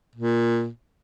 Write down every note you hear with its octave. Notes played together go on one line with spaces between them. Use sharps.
A#2